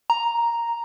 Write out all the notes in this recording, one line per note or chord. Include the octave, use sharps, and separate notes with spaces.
A#5